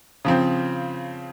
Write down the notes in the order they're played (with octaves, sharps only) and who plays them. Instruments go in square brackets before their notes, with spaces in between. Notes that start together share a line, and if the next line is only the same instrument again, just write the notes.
[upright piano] C#3 F3 C4